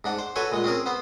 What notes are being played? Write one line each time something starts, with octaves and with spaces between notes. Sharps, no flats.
G#2 D4 F#5
C5
F#4 A4 B4 C#5 G#5
A#2 G#3
C4 C#4 G#4 A#4
B3 C5